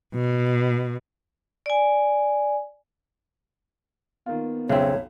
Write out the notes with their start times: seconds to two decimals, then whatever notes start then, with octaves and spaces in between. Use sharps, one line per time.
0.14 B2
1.66 D5 G#5
4.26 D#3 A#3 B3 F4
4.69 B1 F2 C#3 C4 C#5 E5